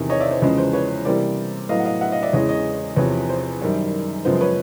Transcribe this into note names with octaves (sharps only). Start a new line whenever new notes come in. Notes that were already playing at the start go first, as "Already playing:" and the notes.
Already playing: E2 C3 D#3
C#5 D#5
D5 E5
C5
E2 C#3 F3 G#3 C#4 B4
C5
B4 C#5
C3 E3 G3 A#3 C5 D5
A2 F#3 B3 D#5 F5
F#5
D#5 F5
E5 F#5
D#5 F5
D5 E5
E2 C#3 E3 G#3 C#5 D#5
C#5 D#5
E2 C3 F3 B4 C#5
C5
F#2 D#3 G3
F#2 C#3 F3 G#3 B3 C5
B4 C#5